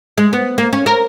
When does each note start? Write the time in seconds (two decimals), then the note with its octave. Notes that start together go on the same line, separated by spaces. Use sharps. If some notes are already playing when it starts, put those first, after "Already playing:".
0.18 G#3
0.33 B3
0.58 A#3
0.73 C#4
0.86 A#4